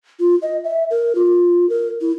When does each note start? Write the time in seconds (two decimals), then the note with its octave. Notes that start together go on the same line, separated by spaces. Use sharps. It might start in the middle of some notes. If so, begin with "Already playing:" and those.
0.20 F4
0.42 D#5
0.64 E5
0.91 A#4
1.15 F4
1.70 A#4
2.01 E4